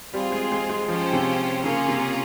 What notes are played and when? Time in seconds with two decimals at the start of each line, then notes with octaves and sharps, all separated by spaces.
0.14 G3 C4 F4 G#4
0.32 G#3
0.52 G#3
0.69 G#3
0.88 F3 C#4 F4 C5 G5
1.13 C3
1.63 C#3 A#3 C#4 F4 G#4
1.88 C3